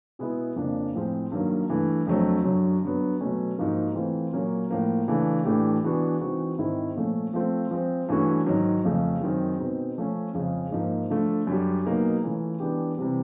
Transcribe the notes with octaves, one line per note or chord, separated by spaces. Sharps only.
B2 G#3 B3 E4
F2 C#3 F3 A#3 D4
A2 F3 G#3 C4 F4
G2 D#3 F#3 A#3
G2 E3 A3
F2 D3 F#3 A3 C4
F#2 D3 F#3
G2 D3 F#3 B3
B2 F#3 A3 C#4
G#2 F3 A#3 D#4 F#4
E3 A3 C4 F4
A#2 F#3 A#3 C#4
A2 F3 A#3
C#3 E3 A3 D4
A2 E3 A3 D4 G4
E3 G#3 B3 D4 F#4
E3 G#3 C4 D#4 F#4
G#2 D#3 G#3 C4 E4
A#2 F3 A3 C#4
F3 A3 C4 F4
F3 G#3 C4
G2 E3 A3 C#4 F#4
G#2 D#3 F#3
F2 C#3 F3 A3
F#2 D#3 G#3 C4
B2 G#3 C4 D#4
F3 A3 C#4
F2 C#3 F3 G#3
G#2 F3 A#3
D3 F3 A3
F#2 D3 G3
B2 F#3 A#3 D#4 G#4
E3 A3 C#4 F4
E3 G#3 B3 D4 G4
C3 E3 G3 C4